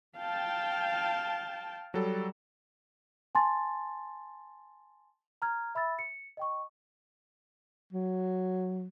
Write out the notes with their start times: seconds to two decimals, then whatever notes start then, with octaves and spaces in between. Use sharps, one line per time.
0.18 F5 G5 A5
1.94 F#3 G3 A4
3.35 G#5 A5 C6 A6
5.42 A#5 F6 G#6
5.75 E5 B5 E6 A6
5.99 C#7
6.37 D#5 G5 C#6
7.93 F#3